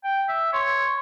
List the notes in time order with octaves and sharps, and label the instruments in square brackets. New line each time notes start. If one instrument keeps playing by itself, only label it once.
[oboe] G5
E5
[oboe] C#5 [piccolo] C6